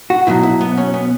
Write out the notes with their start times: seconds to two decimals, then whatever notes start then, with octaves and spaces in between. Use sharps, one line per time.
0.10 F#4
0.27 B2 F#3 E4
0.43 E4
0.61 B3
0.78 C#4
0.94 B3